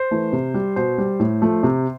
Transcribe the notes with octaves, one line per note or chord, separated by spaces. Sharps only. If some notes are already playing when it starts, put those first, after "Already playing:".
Already playing: C5
E3 A3
C3
G3
B2 C5
G3
A2
F3 A3
C3